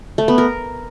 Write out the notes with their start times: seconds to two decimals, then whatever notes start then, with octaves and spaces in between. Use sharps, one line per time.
0.18 A3
0.28 B3
0.38 A#4